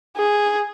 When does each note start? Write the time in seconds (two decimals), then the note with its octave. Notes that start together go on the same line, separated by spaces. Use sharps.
0.16 G#4